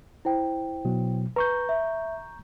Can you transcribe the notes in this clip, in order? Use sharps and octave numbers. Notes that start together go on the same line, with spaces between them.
E4 C5 G5
B2 F#3
B4 A#5 C#6 G6
E5